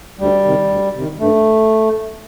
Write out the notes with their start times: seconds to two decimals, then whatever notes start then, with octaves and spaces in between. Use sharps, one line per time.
0.18 D2 G3
0.44 C3 D#3
0.69 D2
0.94 C3 D#3
1.19 G2 A3